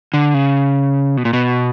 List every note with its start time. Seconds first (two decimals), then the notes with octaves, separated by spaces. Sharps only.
0.14 D3
0.34 C#3
1.17 B2
1.25 A#2
1.33 B2